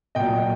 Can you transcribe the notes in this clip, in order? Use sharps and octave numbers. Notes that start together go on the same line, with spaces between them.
A#2 F#3 D#5 G5